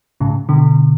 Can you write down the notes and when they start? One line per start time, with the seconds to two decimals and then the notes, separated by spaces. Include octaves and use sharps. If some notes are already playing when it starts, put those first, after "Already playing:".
0.20 A2 C#3
0.49 B2 D3